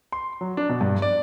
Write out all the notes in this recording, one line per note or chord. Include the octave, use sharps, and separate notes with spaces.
C6
F#3
D4
B2
G2
D5